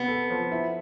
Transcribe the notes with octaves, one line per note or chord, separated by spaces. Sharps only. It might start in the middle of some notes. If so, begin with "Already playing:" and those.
Already playing: C3 B3
A4
F3
E4